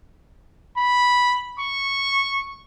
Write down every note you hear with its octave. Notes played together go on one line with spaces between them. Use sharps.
B5
C#6